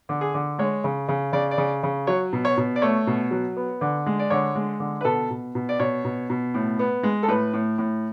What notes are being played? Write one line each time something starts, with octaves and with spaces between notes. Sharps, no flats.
D3
G#4
D3
G#3 C#5
C#3
C#3
C#3 D5
D5
C#3
C#3
F#3 C#5
B2
C#5
B2
D5
A3 C#5
B2
F#3
B3
D3
G#3
D5
D3 C#5
G#3
D3
B4
B2 A4
B2
B2
D5
B2 C#5
B2
B2
A2
B3
G#3
A4
A2 B4
A2
A2